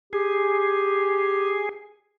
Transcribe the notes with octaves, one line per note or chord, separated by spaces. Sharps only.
G4 G#4